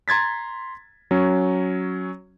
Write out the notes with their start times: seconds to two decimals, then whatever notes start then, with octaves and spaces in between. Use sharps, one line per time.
0.08 A#5 C6 G#6 A6 B6
1.11 F#3 C#4